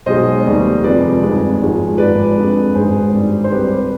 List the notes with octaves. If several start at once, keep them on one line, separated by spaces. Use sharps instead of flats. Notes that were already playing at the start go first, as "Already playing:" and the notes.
B1 B2 G#3 C5 D#5
F1 D#2 D#3 G3
F2 C3 F3 G#3 B4 D5
G1 F2 D#3 G#3
G#1 G#2 F3 G#3
G#1 G#2 F3 G#3 B4 D5
F2 D3 G#3
G#1 G#2 D#3 G#3 G#4 C5
G#1 G2 D#3 G3
C5
C2 C3 G3 G4 B4